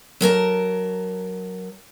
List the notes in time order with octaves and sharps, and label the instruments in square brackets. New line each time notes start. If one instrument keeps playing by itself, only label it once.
[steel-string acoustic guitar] F#3 A#4 G#5 A5